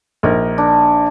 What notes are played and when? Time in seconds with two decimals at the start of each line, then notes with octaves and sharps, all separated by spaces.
0.23 A#1 D#4 A#4
0.58 D4